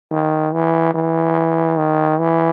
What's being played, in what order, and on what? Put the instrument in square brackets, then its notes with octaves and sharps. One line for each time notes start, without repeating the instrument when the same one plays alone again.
[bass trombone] D#3
E3
E3
D#3
E3